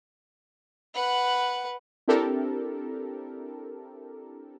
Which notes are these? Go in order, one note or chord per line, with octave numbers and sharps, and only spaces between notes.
B4 F#5
C4 D4 E4 G4 A4 A#4